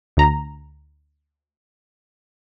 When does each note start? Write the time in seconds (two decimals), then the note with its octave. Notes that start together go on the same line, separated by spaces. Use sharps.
0.17 D2 A#5